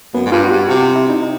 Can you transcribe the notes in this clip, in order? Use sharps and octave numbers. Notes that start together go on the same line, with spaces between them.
F#2 B3
G#2
G2 F4
F#4
G2 G4
C3 F#4
F4
E4
D#4
D#4